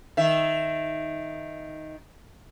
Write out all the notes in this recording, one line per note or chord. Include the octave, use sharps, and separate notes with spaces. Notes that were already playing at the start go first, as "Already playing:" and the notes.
D#3 E5